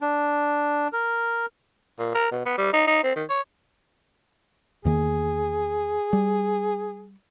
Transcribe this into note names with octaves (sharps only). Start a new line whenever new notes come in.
D4
A#4
A#2
A#4
B2
B3
G3
D#4
D#4
C4
D#3
C#5
E2 D#3 A#3 G#4
G3